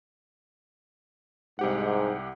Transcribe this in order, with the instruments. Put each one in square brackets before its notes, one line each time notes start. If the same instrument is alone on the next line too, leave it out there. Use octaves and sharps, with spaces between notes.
[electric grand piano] C2 G4 F#5 [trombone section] G#2